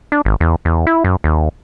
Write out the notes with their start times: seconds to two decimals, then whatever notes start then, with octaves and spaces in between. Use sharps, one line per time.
0.12 D4
0.25 G#1
0.40 E2
0.65 E2
0.87 E4
1.04 F#2
1.24 D#2